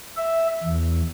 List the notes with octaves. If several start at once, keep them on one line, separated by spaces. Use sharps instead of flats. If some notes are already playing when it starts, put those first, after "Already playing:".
E5
E2